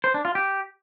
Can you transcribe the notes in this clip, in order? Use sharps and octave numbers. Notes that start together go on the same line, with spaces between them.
C5
D4
F4
G4